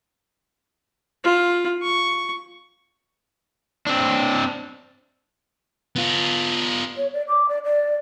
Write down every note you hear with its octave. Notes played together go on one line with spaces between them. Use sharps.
F4
C#6
C4 D4
B3 F4
C#5
D5
D6
D5
D5